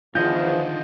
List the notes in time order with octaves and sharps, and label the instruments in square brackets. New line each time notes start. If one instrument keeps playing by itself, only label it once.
[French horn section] E2 F3 [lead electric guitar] D3 D#3 [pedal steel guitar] F4 D#5 F#5 [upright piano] G6